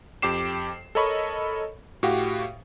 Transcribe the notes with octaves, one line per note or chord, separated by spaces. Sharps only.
F2 G4 G5 D6 C7 E7
A4 A#4 C#5 D#5 B5 C#6
A2 F#4 G4 F5